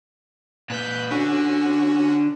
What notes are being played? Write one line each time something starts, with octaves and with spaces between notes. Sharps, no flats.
A#2 B4 F#6 G6
D3 C#4 F#4